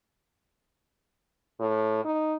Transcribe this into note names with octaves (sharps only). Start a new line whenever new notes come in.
A2
D#4